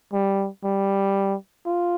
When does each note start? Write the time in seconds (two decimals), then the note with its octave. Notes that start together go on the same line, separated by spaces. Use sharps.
0.13 G3
0.64 G3
1.66 F4